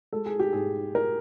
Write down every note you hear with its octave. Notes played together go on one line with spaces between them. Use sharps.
G#3 A4
G#4
G4
G#2 G#4
A#4